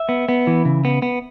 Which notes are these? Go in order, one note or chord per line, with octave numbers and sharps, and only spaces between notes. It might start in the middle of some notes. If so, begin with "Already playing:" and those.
Already playing: E5
B3
B3
E3
C#3
B3
B3